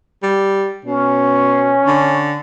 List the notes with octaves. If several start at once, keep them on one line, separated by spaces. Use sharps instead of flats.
G3
B2 C#4
D3